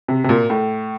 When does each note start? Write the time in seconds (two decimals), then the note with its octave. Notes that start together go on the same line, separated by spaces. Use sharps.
0.08 C3
0.24 C3
0.29 A#2
0.50 A2